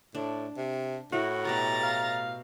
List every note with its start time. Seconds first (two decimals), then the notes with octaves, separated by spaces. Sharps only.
0.15 A2 D4
0.57 C3
1.12 A2 E4 F#4 A#4
1.45 B2 G4 A#4 A#5 A6
1.83 F5